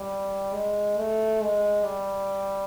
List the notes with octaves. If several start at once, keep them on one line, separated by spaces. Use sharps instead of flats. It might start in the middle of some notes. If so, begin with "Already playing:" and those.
Already playing: G3
G#3
A3
G#3
G3